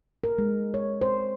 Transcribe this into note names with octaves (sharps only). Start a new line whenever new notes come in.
A#4
G#3
C#5
C5